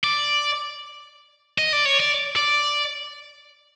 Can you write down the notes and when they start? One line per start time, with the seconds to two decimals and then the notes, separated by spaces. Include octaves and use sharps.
0.04 D5
1.58 D#5
1.73 D5
1.85 C#5
2.00 D5
2.36 D5